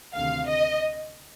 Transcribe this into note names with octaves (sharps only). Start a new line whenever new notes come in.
D2 C3 D#3 F5
D#5